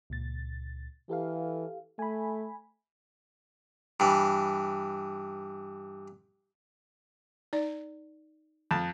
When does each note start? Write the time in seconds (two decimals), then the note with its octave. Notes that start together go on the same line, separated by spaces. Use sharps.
0.10 C#2 A#2 A6
1.09 E3 G4 A4 F5
1.99 A3 G#5 B5
4.00 G2 E3
7.53 D#4 D5
8.71 F2 A5